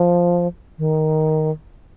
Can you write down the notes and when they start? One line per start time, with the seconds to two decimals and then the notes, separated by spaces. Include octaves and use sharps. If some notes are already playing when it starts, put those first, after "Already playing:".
Already playing: F3
0.78 D#3